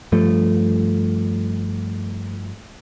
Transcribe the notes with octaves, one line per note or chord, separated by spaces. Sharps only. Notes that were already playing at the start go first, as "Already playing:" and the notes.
G2 F3 A3